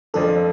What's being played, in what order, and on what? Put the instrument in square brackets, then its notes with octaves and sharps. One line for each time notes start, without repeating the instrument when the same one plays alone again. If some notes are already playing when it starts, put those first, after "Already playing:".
[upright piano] F2 F3 D4 [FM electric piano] A4